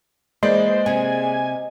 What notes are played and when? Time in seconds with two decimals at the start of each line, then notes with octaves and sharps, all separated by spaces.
0.43 E3 G#3 A#3 C5 D5 D#5
0.86 C3 G#5